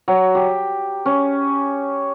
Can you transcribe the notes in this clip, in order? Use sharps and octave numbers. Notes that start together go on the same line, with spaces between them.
F#3
G4
C#4